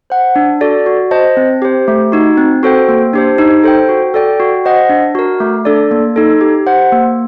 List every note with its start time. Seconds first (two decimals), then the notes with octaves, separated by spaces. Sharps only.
0.10 C5 F#5
0.36 D4
0.61 F#4 A4 D5
0.86 F#4
1.11 C5 D#5 A5
1.37 C4
1.62 G4 C5
1.88 A3
2.12 D#4 F#4
2.38 C4
2.63 F#4 A4 C5 G5
2.89 A#3
3.13 D4 G4 C5
3.38 D#4
3.64 A4 C5 G5
3.89 F#4
4.14 A4 D5 G5
4.40 F#4
4.65 C5 D#5 F#5
4.90 D4
5.15 F#4 A#4
5.40 A3
5.65 D4 A4 D5
5.91 A#3
6.16 D#4 A4
6.41 G4
6.66 C5 F#5
6.92 A#3